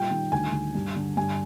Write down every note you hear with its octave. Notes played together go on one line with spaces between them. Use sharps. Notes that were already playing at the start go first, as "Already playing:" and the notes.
Already playing: A#2 G3 G5
D#3
D2 G#5
D2
G2
D3
G2 G#5